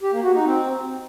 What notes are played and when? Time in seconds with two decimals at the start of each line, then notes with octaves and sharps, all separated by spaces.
0.02 G4
0.12 A#3
0.23 F#4
0.34 D#4
0.45 C4